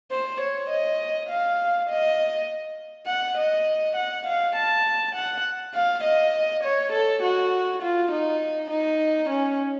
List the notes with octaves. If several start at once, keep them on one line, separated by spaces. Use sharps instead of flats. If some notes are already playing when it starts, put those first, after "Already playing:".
C5
C#5
D#5
F5
D#5
F#5
D#5
F#5
F5
A5
F#5
F5
D#5
C#5
A4
F#4
F4
D#4
D#4
C#4